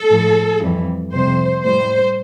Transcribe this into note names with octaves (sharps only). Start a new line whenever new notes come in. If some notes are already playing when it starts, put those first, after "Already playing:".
Already playing: A4
A2 F3
F2 E3 G3
F2 C3 G3 C5
A2 G3 C5